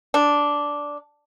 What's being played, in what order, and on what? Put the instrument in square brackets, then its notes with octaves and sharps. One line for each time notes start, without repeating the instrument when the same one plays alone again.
[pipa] D4